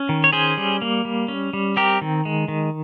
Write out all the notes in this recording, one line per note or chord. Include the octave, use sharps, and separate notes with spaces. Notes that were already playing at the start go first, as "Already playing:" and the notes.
Already playing: C#4
D#3
C#5
C#4 G#4 C5
G3
A#3
G3
C#4
G3
C4 G4 A#4
D#3
G#3
D#3